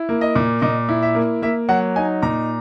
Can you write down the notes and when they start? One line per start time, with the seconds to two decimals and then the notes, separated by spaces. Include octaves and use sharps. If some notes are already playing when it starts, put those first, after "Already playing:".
Already playing: E4
0.09 A#3
0.21 D#5
0.35 A#2
0.62 A#2 D#5
0.89 E4
1.02 E5
1.15 A#3
1.42 A#3 E5
1.69 F#3 F#5
1.96 D#4 G#5
2.22 A#2 A#5